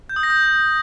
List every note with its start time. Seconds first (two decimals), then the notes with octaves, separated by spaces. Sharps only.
0.09 G6
0.16 D#6
0.23 A#6
0.30 G6